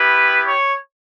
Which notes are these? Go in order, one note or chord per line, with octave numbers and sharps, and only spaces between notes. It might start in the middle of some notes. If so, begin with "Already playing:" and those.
Already playing: B3 E4 G4 B4
C#5